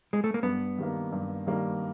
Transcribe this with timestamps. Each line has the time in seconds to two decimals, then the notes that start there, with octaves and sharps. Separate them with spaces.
0.13 G#3
0.24 A3
0.34 A#3
0.43 G2 B3
0.78 D#3 G3 A#3
1.12 G2
1.47 D#3 G3 A#3